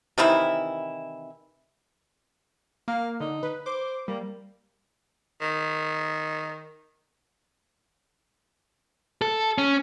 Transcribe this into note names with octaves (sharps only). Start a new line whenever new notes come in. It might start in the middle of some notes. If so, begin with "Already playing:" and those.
C3 D#3 E3 E4
A#3 F5
D3 D#4
B4
C5 D6
G3 A#3
D#3
A4
C#4